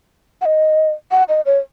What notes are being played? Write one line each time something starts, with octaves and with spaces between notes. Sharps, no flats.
F#5
D#5
F#5
D#5
C#5